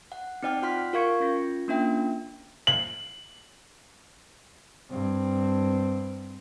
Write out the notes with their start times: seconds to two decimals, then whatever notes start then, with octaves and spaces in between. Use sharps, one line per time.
0.12 F#5
0.43 C4 D#4 D5 G5 F6
0.62 F4 F#5 C6 F6 B6
0.93 F4 A#4 F5 C#6 G#6 C#7
1.20 C#4 F4 A#6
1.68 A#3 C#4 D4 F4 E5 G5
2.67 F#7
4.90 G2 C4